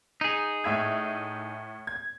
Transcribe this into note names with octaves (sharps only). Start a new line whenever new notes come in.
D#4 G#4
A2 E5 G#6
G#6